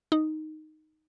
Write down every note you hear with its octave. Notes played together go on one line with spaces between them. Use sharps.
D#4